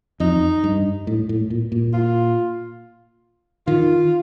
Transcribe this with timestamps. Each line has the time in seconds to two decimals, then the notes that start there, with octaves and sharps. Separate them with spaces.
0.20 F2 D#4
0.64 G2
1.07 A2
1.29 A2
1.50 A#2
1.72 A#2
1.93 F4
3.67 D#3 F4